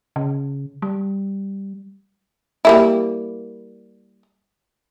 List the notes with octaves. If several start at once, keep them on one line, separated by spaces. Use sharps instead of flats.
C#3
G3
G3 A#3 E4